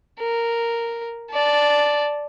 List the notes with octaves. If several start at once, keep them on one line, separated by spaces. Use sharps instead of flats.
A#4
D5 A5